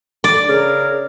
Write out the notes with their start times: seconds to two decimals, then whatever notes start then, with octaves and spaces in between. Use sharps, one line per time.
0.24 D5
0.49 C#3 G#4 A#4